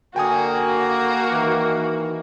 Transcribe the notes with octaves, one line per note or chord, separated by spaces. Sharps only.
D3 A#3 F#4 G5 G#5 D#6
D#3 E3